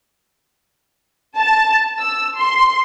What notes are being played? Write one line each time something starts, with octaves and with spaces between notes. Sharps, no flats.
A5
E6
C6